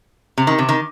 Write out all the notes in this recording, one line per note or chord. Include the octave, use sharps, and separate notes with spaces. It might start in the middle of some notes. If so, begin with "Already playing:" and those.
C3
D#3
C3
D#3